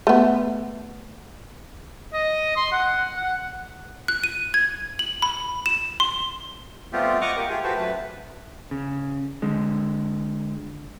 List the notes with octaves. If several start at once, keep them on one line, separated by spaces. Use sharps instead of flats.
A3 B3
D#5
C6
F#5
F#5
F#6
D#7
G#6
F#7
B5
E7
C6
G3 A3 B3 C4 F4 G4
D#5 F#5 C#6 D6 F6
A#3 G4 A#4
A3 F4 G4 G#4
F#4 G4 A4 B4 C5
F#2 A3 B4
C#3
D3 G#3